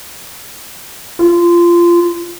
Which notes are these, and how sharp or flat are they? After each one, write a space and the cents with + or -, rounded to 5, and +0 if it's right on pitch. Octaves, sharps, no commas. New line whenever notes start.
F4 -20